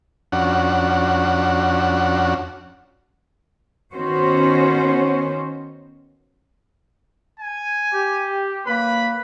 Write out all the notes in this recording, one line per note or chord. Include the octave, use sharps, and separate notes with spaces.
F2 C#4 D4 F#4 F#5
D#3 B3 C#4 F#4 C5
G#5
G4
F#2 A#3 B4 B5